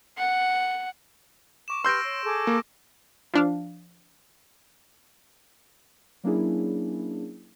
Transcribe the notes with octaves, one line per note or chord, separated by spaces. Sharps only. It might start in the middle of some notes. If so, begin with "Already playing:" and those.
F#5
C#6 D6 E7
G4 B4 C6 E6 F6 G6 A#6 D7
C#5
G#4 A4 D6
A#3
F3 D4 F5
F#3 A#3 C#4 D4 E4 G#4